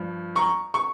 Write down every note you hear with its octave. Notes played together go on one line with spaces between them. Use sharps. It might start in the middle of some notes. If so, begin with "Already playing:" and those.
Already playing: G2 F3
A#5 C#6
C#6